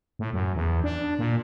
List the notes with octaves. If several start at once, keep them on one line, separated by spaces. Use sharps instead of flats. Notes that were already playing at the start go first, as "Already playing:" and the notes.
A2
F#2
E2
D4
A#2